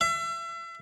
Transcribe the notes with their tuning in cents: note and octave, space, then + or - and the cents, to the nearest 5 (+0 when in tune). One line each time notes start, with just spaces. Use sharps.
E5 +35